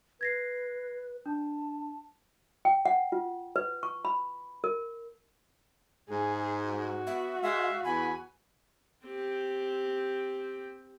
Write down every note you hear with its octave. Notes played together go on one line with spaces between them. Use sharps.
B4 G#6 A#6 C7
D4 A5
G5
F#5
F4
B4
C#6
B5
A#4
G#2 G#4
F#4
B3 E5
G#3 E5 F5
E2 G#5 B5
C4 G4